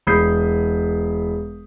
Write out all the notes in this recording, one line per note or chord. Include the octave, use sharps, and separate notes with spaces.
E1 B5 D#6 G6 C7